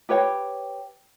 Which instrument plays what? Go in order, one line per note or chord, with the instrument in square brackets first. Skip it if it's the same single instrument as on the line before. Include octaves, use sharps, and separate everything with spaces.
[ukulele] G4 B4 C#5 G5